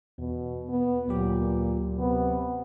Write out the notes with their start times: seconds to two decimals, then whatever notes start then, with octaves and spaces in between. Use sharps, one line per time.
0.18 E2 B2
0.69 B3
1.08 D2 A#2 F#3 G4
1.98 C3 B3